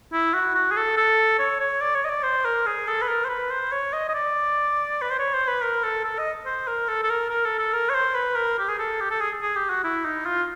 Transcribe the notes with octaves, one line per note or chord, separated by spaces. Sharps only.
E4
F#4
F#4
G#4
A4
A4
C#5
C#5
D5
C#5
D#5
D5
C5
A#4
G#4
A4
B4
A#4
C5
B4
C5
C#5
D#5
D#5
D5
B4
C5
C#5
C5
B4
A#4
A4
A4
D#5
C5
A#4
A4
A4
A#4
A#4
A4
A4
A#4
C#5
C5
B4
A#4
G4
G#4
A4
G4
A4
G#4
G#4
G4
F#4
E4
D#4
F4